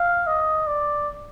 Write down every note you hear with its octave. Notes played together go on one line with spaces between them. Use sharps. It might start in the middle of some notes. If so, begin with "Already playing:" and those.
Already playing: F5
D#5
D5